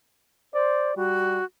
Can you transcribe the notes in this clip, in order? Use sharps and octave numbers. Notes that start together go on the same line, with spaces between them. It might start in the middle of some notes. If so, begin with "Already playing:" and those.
C5 D5
G3 F#4